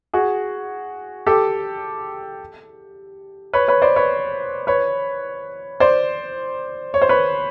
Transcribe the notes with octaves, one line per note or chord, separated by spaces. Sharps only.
F#4 G#4
G4 A4
B4 C#5
B4 C#5
C5 D5
B4 C#5
B4 C#5
C5 D5
C#5
C5
B4 C#5